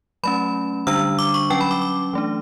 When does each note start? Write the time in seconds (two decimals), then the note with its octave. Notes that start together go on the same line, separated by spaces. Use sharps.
0.23 F#3 A3 C#4 B5
0.87 D3 G3 D4 E6
1.19 D6
1.34 C#6
1.50 F#3 C#4 G5
1.61 B5
1.71 D6
1.82 D6
2.13 E3 A3 D4